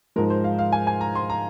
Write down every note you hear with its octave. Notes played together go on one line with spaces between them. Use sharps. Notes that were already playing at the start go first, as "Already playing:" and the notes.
G#2 F3 G#3 A#4
C5
F5
F5
G#5
G#5
A#5
C6
A#5